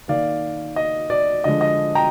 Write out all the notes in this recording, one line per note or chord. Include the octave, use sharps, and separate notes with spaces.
D#3 A#3 D5 F5
D#5
D5
D3 F3 G#3 D#5
D#5
G5 A#5